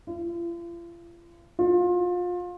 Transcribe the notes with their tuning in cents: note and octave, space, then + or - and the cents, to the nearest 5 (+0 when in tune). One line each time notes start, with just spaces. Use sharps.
F4 -40
F4 +30